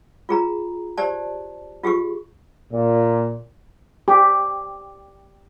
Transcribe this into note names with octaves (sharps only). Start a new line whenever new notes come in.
F4 G#4 A#5
G4 C5 D5 A5
F4 G4 G#4 C#6
A#2
G4